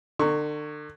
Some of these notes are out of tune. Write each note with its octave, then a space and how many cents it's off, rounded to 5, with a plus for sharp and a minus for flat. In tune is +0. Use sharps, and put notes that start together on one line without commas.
D3 +35 A#5 -25 C#6 +0